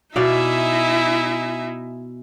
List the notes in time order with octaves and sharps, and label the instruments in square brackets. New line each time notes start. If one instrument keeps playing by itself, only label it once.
[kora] B2 D5 F5 [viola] D#4 E4 [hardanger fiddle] E5 G#5